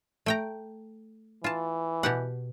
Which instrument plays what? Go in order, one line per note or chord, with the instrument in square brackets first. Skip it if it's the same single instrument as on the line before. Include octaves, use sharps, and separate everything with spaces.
[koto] A3 G5 A#5
[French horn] E3 [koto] F4 A5
[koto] B2 G4 F#5